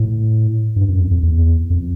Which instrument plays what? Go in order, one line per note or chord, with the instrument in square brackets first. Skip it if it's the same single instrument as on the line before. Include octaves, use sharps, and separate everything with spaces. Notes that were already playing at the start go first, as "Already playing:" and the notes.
Already playing: [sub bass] A2
G2
F#2
F2
F2
E2
F2